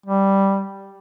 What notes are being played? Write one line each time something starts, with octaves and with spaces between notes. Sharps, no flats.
G3